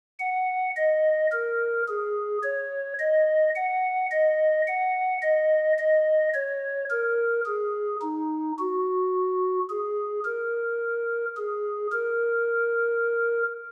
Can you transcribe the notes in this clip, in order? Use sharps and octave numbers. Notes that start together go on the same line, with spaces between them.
F#5
D#5
A#4
G#4
C#5
D#5
F#5
D#5
F#5
D#5
D#5
C#5
A#4
G#4
D#4
F#4
G#4
A#4
G#4
A#4